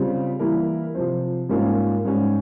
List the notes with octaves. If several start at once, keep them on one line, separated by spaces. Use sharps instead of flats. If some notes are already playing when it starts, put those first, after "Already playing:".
Already playing: C#3 G3 C4 F4
E3 G3 A#3 E4 A#4
C3 F3 C4
G#2 G3 A#3 C#4 F4
G#2 G3 C#4